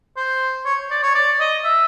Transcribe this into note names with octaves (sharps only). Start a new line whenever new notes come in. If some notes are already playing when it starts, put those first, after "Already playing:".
C5
C#5
D5
C#5
D5
D#5
E5